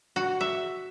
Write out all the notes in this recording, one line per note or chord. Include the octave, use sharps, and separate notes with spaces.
F#4
E5